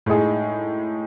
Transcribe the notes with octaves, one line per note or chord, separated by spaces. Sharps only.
A2 G#3 D#4 G#4